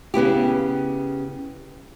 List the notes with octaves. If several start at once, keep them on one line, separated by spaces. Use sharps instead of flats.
C#3 B3 E4 G4